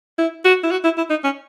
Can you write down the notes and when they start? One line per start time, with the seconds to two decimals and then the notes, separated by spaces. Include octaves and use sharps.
0.19 E4
0.45 F#4
0.64 E4
0.71 F#4
0.84 E4
0.98 E4
1.10 D#4
1.24 C#4